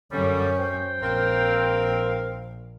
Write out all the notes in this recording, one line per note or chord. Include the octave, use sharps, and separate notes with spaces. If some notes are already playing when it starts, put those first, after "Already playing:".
F#2 D3 G3 C#4
C5 G5
A#1 C4 A#4 F5